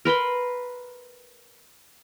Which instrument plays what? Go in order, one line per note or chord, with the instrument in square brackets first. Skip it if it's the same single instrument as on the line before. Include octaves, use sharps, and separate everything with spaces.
[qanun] A#4 B4 B5 C6